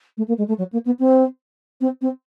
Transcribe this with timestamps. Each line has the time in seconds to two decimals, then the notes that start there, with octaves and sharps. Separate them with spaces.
0.17 A3
0.27 A#3
0.38 G#3
0.48 A3
0.58 F#3
0.72 A#3
0.85 B3
0.99 C4
1.80 C4
2.01 C4